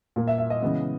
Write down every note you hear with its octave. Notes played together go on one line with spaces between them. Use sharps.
A#2 A#3
E5
E5
D#5
C#3 E3 G#3 B3